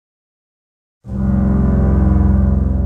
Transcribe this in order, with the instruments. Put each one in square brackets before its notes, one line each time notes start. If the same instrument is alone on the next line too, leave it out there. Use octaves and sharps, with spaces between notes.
[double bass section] F1 C2